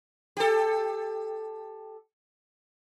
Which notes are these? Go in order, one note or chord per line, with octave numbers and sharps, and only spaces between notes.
G4 A4